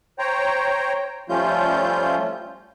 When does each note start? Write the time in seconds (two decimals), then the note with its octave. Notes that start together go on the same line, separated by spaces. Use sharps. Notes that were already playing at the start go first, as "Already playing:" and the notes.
0.19 C5 C#5 G5 A#5
1.29 F3 G3 A3 C#4 F4 G6